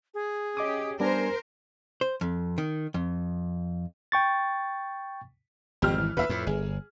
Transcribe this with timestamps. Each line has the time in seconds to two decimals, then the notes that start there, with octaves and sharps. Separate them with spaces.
0.14 G#4
0.57 C#4 G4 D#5 D6 D#6
1.00 G3 B3 D4 A#4 C5 G#5
2.01 C5
2.21 F2
2.58 D#3
2.94 F2
4.12 G5 C#6 A6
5.82 G#1 F2 G4 F6
5.98 E3
6.17 D2 A#2 B4 E5
6.29 F2 A2
6.47 G1 G#4